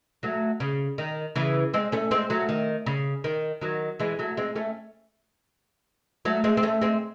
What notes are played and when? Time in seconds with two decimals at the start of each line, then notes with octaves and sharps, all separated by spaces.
0.23 F#3 A3
0.60 C#3
0.98 D#3
1.36 C#3 E3
1.74 G#3 C4
1.92 A3 C#4
2.11 G#3 C4
2.30 F#3 A3
2.49 D#3
2.86 C#3
3.24 D#3
3.61 D#3 F#3
3.99 E3 G#3
4.19 F#3 A3
4.37 G#3 C4
4.56 A3 C#4
6.25 F#3 A3
6.44 G#3 C4
6.57 C4
6.63 A3 C#4
6.81 G#3 C4